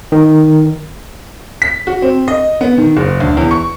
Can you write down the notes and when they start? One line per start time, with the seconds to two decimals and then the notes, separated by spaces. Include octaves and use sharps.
0.12 D#3
1.62 B6
1.87 F#4
2.02 C4
2.28 D#5
2.61 B3
2.78 D#3
2.97 F#1
3.20 D2
3.37 E2
3.51 C#6